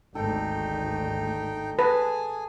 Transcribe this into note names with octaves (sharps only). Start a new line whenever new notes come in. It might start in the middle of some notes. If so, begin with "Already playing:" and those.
G#1 D2 D#4 A4 G5
G#4 B4 G#5 A5